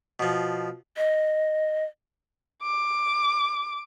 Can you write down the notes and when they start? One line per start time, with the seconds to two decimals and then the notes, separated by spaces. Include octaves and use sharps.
0.20 B2 F3
0.97 D#5
2.63 D6